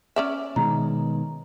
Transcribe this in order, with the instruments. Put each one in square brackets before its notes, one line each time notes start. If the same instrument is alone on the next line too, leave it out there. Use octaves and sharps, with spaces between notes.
[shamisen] C#4 D5 E5
[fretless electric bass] B2 D#3 G#3 [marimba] A#5